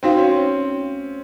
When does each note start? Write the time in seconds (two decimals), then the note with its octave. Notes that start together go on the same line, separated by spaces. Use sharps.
0.03 C4 D#4 F#4 C5 F5
0.17 C#4
0.32 C4